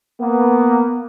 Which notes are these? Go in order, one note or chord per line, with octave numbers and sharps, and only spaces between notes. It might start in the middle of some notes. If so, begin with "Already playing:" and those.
A#3 B3